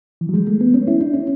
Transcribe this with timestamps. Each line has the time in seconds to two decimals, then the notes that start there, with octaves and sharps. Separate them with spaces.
0.21 E3
0.29 F#3
0.34 G#3
0.47 A3
0.61 B3
0.74 C#4
0.88 E4
1.01 D4
1.14 C#4